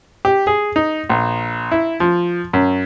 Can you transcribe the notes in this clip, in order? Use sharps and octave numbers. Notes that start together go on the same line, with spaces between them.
G4
G#4
D#4
A#1
E4
F3
F#2